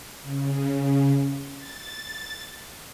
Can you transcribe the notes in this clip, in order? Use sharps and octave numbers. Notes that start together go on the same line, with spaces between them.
C#3
A6